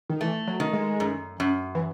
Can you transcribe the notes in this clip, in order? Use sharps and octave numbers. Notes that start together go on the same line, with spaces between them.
D#3
E3 A3
F#3
D#3
G#3
F#2
F#2
E3